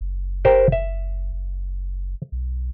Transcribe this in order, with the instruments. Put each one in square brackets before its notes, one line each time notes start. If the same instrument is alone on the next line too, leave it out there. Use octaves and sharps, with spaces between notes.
[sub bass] F#1
[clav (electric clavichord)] G4 A#4 C5
E5
[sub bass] F#1
B1